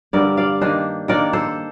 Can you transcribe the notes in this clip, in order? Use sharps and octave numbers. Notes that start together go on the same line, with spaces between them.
G2 D3 G3 A#4 D5
D5 F5
D#3 A#3 D4 C5 D#5
D#3 A#3 D4 A#4 D5
A4 C5